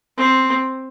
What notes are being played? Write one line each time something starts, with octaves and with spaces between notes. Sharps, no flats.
C4